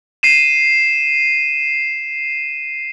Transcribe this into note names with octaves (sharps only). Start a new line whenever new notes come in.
C7 D#7 E7